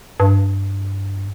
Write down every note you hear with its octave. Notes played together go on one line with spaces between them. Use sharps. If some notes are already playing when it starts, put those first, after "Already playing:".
G2